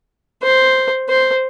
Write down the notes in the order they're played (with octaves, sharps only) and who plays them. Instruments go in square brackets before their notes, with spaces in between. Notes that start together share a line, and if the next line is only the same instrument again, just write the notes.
[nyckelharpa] C5
C5